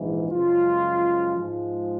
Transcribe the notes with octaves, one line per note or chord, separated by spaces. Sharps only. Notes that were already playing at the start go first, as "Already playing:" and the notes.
Already playing: A#1 G#2 E3
F#2 C#3 F3 G#3 F4
G#2 F3 G#3